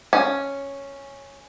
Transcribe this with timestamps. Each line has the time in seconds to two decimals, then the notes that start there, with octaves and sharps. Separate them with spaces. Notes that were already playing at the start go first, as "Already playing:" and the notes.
0.13 C#4